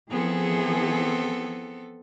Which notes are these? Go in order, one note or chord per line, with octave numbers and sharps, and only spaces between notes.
E3 F3 B3 C4 G#4 A4